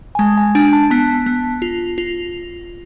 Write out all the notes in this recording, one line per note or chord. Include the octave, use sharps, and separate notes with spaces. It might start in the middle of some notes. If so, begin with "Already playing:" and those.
G#5
G#3 A5
G#5
D4 G#5
A5
B3 A5
B3
F4
F4